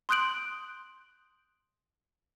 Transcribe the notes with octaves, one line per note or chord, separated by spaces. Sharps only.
C6 D#6 F#6 G6 D7 F#7